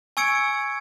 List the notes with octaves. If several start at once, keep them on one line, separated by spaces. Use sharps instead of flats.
G#5 C#6 E6 G#6 C#7 D7